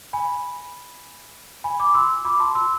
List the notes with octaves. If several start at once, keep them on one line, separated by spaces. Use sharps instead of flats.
G#5 B5
G#5 B5
B5 D6
C6 E6
B5 D6
A5 C6
C6 E6